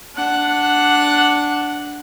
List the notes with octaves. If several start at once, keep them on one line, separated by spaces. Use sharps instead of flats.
D4 F#5